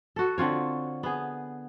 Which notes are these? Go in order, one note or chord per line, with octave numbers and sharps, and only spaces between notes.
F#4 A4
D3 C4 F4 C#5
B3 G#4